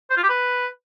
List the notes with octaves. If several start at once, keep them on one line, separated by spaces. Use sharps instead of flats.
C5
F4
G4
B4